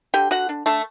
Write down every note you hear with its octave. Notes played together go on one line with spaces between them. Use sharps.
D3 G4 G5
D3 F#4 F#5
D4
A3 D4 A4